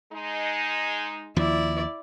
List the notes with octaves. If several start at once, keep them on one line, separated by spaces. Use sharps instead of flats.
G#3 D#4
D#2 F3 E4 D5